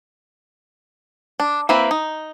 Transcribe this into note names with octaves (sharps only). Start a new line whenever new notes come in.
D4
A#3 C4 E4 B4 E5
D#4